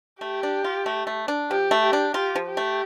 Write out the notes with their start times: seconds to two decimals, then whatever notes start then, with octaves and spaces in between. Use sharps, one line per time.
0.21 A3 G4
0.43 D4
0.64 F4
0.86 A3
1.07 A3
1.28 D4
1.50 F3 G4
1.71 A3
1.82 G4
1.93 D4
2.14 F4 G4
2.35 F3
2.47 G4
2.57 A3